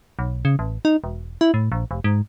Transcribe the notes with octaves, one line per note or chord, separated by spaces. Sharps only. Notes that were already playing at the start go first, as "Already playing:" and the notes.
B1
C#3
A1
D#4
E1
E4
A2
A#1
F1
G#2